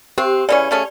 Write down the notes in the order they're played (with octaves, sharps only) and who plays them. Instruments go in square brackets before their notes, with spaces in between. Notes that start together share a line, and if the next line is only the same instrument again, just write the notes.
[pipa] C4 [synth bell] G4
[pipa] C#3 E3 C#4 [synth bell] D5
[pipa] C#3 A3 C#4